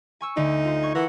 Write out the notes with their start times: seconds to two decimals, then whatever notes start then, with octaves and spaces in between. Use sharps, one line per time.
0.21 G#5 C#6 E6
0.37 D2 D3 D#4
0.65 F4 C5
0.83 C#6 G#6
0.95 E3 A#4 F#5